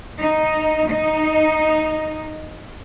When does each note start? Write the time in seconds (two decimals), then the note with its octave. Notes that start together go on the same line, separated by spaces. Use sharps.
0.19 D#4
0.89 D#4